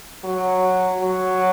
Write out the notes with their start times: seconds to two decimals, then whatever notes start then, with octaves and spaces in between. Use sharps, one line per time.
0.25 F#3
1.01 F#3